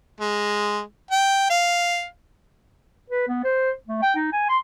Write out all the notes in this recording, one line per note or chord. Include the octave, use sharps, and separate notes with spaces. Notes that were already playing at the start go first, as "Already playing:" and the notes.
G#3
G5
F5
B4
B3
C5
A3
G5
D#4
G#5
C6